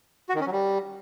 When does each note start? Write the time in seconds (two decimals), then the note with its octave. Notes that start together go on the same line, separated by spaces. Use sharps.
0.29 F#4
0.35 D#3
0.41 C#4
0.46 F#3
0.52 G3